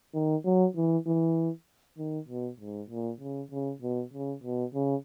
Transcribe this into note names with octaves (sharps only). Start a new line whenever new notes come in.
D#3
F#3
E3
E3
D#3
B2
G#2
A#2
C#3
C#3
B2
C#3
B2
C#3